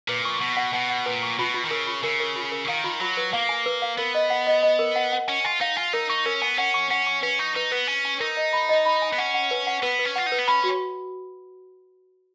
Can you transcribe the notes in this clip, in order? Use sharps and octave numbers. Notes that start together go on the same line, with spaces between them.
A#2 B4
C#6
B2 C#6
F#5
B2 F#5
F#5
A#2 B4
C#6
B2 F4
F4
D#3
C#3 A#4
F4
C#3 A#4
A#4
F4
A#4
D#3 F5
F4
F#3 F4
B4
A#3 F5
G#5
B4
F5
B3 A#4
D#5
F#5
D#5
D#5
A#4
F#5
F#5
C#4 G#5
F4 G#5
D#4 F5
F4 G#5
D#4 A#4
D#4 C#6
C#4 A#4
B3 G#5
C#4 F#5
C#6
C#4 F#5
C#6
C#4 B4
D#4 C#6
D#4 B4
B3 B4
C#4 G#5
G#5
D#4 A#4
D#5
B5
D#5
B5
G#5
B3
C#4 F#5
F#5
B4
F#5
B3 B4
B4
C#4
F4 F#5
D#4
B4
B3
C#4 B5
F#4